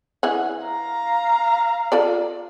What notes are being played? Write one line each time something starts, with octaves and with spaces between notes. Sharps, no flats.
E3 G#4 F#5
F5 A#5
F4 A4 D5